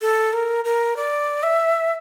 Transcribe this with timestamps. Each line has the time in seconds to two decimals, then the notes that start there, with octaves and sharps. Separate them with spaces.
0.01 A4
0.33 A#4
0.64 A#4
0.96 D5
1.43 E5